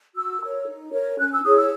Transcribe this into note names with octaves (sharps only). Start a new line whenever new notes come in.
F#4 E6
A#4 C#5
D#4
A#4 C#5
C#4 F#6
E6
E4 G#4 C#5 D#6
E6